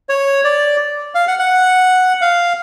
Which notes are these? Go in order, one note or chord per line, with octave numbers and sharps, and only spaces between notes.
C#5
D5
F5
F#5
F#5
F5